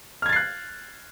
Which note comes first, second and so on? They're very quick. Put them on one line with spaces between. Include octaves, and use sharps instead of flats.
F6 G#6 A6 C7 F#6